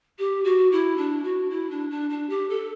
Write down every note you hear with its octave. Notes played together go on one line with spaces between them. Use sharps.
G4
F#4
E4
D4
F#4
E4
D4
D4
D4
G4
A4